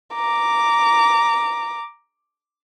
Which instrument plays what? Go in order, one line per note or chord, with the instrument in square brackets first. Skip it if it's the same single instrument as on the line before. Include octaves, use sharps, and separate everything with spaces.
[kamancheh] A#5 D6